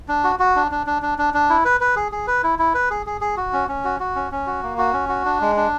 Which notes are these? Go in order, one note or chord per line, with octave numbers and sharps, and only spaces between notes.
D4
F#4
F#4
D4
D4
D4
D4
D4
D4
E4
B4
B4
G#4
G#4
B4
E4
E4
B4
G#4
G#4
G#4
F#4
C#4
C#4
F#4
F#4
C#4
C#4
F#4
A#3
F#4
C#4
F#4
D4
G#3
D4